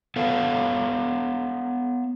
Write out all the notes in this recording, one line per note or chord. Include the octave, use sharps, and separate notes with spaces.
B3 A4 C#5 F5